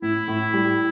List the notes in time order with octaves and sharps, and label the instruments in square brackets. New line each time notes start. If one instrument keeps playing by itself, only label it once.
[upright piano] A2 [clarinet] E4
[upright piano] A2
G3